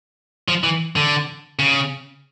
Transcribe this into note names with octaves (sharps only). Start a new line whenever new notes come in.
F3
E3
D3
C#3